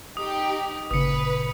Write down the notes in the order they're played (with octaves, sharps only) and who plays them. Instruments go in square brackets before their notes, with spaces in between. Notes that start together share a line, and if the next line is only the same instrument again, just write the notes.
[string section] D#4 G4 [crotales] D#6
[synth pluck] G1 A#2 C#3 [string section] B4 [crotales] D#6 C#7